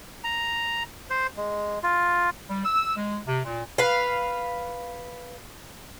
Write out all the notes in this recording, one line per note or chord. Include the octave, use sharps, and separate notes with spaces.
A#5
C5
G#3
F4
G3
E6
G#3
C3
A#2
B4 F5